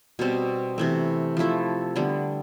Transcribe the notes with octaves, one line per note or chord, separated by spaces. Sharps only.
B2 G3 C4
C3 E3 A3
F3 A3 E4 A4
D3 G3 B3